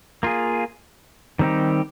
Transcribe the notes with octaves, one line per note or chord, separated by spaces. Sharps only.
A#3 F4 G#4
D#3 G3 C4 D#4 G4